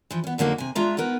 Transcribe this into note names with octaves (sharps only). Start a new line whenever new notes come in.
E3 F3
B3 C#4
F2 D3 F#3 A#3 D#4
C3 G#5
G#3 D4 F4 E5 A#5
B3 D#4 A#4 B4